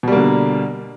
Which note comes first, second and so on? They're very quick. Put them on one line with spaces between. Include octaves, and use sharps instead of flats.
B2 G3 A#3 D3